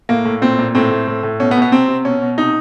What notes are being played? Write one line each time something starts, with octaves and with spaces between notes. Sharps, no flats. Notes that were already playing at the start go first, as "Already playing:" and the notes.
A2 A#3
A2
A#2 C4
A#2
A2 C4
A2
A2
A2
B2 C#4
B3
B2
B3
C3 C4
C3
B2 C#4
B2
C3 D#4